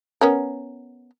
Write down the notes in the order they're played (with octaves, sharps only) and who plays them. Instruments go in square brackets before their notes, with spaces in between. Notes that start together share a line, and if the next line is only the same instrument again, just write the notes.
[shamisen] B3 C#4 A#4